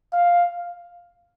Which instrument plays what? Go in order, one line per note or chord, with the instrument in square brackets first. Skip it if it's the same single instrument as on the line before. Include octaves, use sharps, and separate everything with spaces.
[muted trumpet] F5